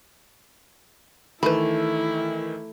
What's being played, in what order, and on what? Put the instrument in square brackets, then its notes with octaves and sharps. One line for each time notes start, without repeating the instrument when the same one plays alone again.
[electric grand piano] D#3 E3 [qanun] A3 [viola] E4 [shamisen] B4 B5